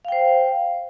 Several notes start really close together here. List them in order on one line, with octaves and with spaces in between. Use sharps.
F5 G5 C5